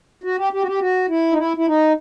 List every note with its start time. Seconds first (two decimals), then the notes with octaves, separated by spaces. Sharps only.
0.24 F#4
0.38 G4
0.53 G4
0.62 F#4
0.67 G4
0.81 F#4
1.09 E4
1.32 D#4
1.38 E4
1.57 E4
1.67 D#4